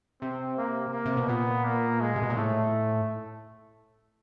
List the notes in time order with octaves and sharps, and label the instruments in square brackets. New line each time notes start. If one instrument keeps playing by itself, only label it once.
[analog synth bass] C3 [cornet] C4
[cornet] A#3
A#3
[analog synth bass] C3
B2
[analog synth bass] A#2 [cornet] B3
[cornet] A#3
G#3
[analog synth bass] C3
B2
A#2
[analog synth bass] A2 [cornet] A3